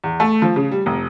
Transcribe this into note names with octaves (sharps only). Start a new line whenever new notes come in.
E2
A3
F3
C#3
G3
F1